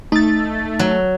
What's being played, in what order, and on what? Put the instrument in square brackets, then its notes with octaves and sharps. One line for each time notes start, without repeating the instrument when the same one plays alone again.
[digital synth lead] A3 [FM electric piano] D#4 A6
[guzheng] F#3